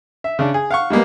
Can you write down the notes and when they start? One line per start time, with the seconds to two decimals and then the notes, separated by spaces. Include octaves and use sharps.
0.24 E5
0.39 C#3 D4
0.54 G#4
0.71 F5 F#5 C#6
0.90 G3 G#3 A#3 B3